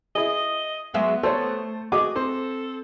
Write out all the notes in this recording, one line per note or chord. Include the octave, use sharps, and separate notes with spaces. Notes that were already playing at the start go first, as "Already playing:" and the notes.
E4 G#4 D#5
F#3 G#3 B3 E5
A3 A4 C5 C#5
F#4 G#4 D#5 D6
C4 A4 C5